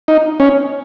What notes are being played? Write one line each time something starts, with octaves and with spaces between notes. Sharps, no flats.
D#4
C#4